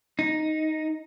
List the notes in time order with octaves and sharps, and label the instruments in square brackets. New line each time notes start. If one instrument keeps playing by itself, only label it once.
[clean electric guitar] D#4